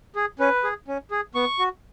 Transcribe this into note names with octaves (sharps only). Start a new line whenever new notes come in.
G#4
C#4 B4
G#4
C#4
G#4
B3 C#6
F#4